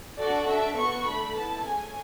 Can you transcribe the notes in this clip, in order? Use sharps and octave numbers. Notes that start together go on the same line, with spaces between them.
D4 F#4 A4 D5
D4 A4 E5
B3 F#4 A4 C#6
A3 D4 A4 B5
B3 E4 A4 A5
A3 C#4 G#4 G#5